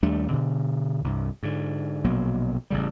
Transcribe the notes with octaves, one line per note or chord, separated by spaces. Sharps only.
D#2 G3 A3 D4
B2 D3
C2 G2
G#2 D3
A#1 B2 F#3 A#3
A1 C#3 G3